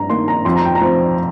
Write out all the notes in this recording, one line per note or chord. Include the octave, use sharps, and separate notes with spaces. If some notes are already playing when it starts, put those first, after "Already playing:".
Already playing: G2 A#5
D#3 A#3 C6
A#5
F2 C6
A#5
G5
A#5
F3 C4